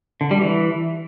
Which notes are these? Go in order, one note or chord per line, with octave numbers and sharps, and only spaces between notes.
D3
G3
E3